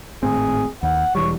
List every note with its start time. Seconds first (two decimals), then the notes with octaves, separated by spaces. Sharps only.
0.23 G#1 A2 C4 G#4
0.83 D#2 F#5
1.15 E1 E3 G3 C#5